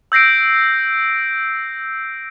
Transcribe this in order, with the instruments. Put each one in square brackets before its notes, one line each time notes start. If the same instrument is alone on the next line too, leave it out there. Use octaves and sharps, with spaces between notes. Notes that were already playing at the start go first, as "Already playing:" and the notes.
[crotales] E6 G6 A#6 C7 D7